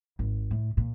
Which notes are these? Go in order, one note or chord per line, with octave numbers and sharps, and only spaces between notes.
G#1
A2
A#2